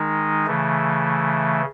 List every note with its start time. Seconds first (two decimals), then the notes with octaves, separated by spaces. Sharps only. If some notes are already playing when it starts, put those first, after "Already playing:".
Already playing: D#3 G#3 D#4
0.46 C#3 E3 A3